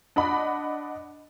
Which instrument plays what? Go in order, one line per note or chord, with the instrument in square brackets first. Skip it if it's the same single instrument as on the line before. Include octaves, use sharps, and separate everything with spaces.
[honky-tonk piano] D4 D#5 F#5 B5